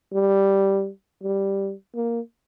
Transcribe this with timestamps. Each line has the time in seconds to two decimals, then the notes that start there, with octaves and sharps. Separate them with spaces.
0.13 G3
1.23 G3
1.95 A#3